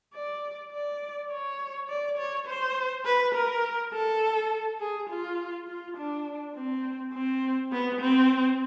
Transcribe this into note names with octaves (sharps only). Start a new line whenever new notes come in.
D5
D5
C#5
D5
C#5
C5
B4
A#4
A4
G#4
F4
F4
D4
C4
C4
B3
C4